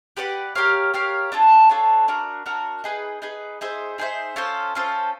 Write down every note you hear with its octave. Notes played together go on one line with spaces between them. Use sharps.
G4 B4 D5 F#5
G4 A#4 C#5 F5
G4 A#4 C#5 F5
D4 F4 A4 C#5
D4 F4 A4 C#5
D4 F#4 A#4
D4 F#4 A#4
D#4 G#4 B4
D#4 G#4 B4
D#4 G#4 C5 E5
D#4 G#4 C5 E5
C#4 F4 A4 C5
C#4 F4 A4 C5